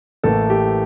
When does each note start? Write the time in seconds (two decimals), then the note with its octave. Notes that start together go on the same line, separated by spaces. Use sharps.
0.23 A1 A2 E3 A#3 A4
0.50 G4